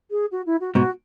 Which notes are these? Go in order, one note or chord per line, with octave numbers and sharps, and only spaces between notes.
G#4
F#4
E4
F#4
G#2 B2 F#4